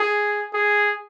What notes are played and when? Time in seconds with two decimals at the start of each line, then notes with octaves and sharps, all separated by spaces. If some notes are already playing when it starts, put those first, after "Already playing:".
Already playing: G#4
0.54 G#4